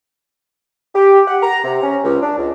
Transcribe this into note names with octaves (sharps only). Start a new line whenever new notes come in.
G4
F#5
A#5
C3
C#4
C#2
D4
C#2